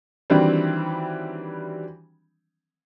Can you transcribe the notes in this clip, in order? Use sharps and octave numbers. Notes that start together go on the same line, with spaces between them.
D#3 E3 F#3 G3 C4 D4